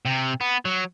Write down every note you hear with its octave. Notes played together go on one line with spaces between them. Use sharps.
C3
B3
F#3